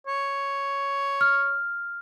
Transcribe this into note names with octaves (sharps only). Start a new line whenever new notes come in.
C#5
F6